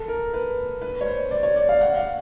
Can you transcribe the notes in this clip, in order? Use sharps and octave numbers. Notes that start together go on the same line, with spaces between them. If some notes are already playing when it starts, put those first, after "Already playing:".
Already playing: A4
A#4
B4
B4
C#5
C5
D5
C#5
D5
F5
F#5
F5